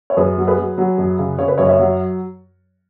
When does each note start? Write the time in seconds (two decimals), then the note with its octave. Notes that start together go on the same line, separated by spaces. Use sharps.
0.10 C#5
0.17 F#2 G#4 B4
0.38 F#3
0.47 G#4 B4
0.58 F#3
0.78 F#3
0.98 F#2
1.19 C#3
1.38 C#3 C#5
1.48 B4
1.57 F#2 A#4 C#5
1.65 D#5
1.69 C#5 E5
1.79 F#3